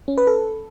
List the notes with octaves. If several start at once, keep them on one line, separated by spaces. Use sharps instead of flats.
C#4
B4
A4